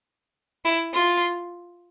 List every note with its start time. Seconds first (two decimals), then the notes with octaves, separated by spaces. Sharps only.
0.65 E4
0.94 F4